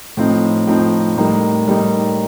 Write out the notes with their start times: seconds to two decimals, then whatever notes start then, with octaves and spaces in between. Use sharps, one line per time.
0.17 A2 F3 C4 D#4
0.67 A2 F3 C4 D#4
1.17 A2 G3 A#3 D#4
1.66 A2 G3 A#3 D#4